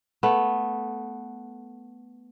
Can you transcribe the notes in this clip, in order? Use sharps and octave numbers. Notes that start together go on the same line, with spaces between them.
A3 B3